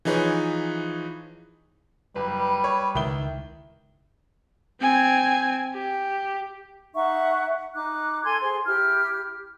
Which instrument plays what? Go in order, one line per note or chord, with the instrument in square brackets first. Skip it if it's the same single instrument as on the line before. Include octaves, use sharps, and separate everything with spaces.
[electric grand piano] E3 F3 D#4 G#4 B4 C#5
[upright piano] F#1 [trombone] G3 [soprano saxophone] B4
[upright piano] C#5
[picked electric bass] C#2 [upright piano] D#3 E4 G7
[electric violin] C4 G#5
G4
[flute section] D#4 E5 F#5 C#6
D#4 D6 F#6
A4 G#5 C6 G#6
G#4 C5 C6
E4 G4 F6